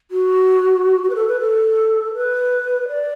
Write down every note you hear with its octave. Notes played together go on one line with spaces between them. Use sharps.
F#4
F#4
B4
A4
B4
A4
B4
D5